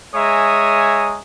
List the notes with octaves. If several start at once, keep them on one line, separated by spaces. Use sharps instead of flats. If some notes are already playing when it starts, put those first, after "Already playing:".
G#3 C#5 E5 G#5 A#5 D#6